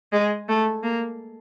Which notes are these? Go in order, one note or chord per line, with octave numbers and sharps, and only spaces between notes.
G#3
A3
A#3